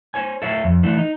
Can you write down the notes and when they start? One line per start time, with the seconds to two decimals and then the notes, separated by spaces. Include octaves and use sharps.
0.14 C5 C#5 G#5
0.42 A4 C#5 E5 F5
0.64 F2
0.83 E3 A3 D4
0.97 D#4